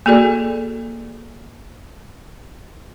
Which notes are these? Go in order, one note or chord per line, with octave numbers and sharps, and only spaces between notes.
A#3 F#4 G#4 A4 D5